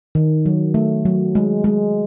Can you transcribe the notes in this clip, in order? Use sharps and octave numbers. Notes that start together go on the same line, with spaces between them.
D#3
F#3
A3
F#3
G#3
G#3